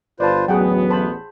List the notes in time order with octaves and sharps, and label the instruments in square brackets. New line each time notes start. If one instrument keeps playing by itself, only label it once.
[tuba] G1 [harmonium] F4 B4 C5 [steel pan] D5 A5
[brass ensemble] A1 B3 [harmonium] D2 [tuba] F#3 [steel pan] G#4 F#5 G5
[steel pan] C5 A5 B5